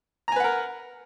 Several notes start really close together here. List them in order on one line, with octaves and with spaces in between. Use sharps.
A#5 G#5 B4 F#5 A#4